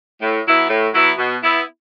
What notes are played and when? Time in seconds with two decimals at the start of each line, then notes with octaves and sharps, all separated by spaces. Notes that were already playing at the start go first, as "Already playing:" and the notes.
0.22 A2
0.46 F#3 B3 E4
0.69 A2
0.93 F#3 B3 E4
1.18 B2
1.42 B3 E4